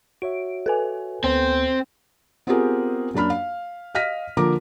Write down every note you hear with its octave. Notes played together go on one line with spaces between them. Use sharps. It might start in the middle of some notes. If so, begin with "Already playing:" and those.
F#4 C#5 E5 D7
A4 B4 G#5
D2 B3 C4 C6
B3 C4 F4 G4 G#4 A#4
F#2 A#3 D4 B5 F6
F5
D#5 F5 F6 A#6 B6 D#7
D3 F3 A#3 A#4 A#5 D6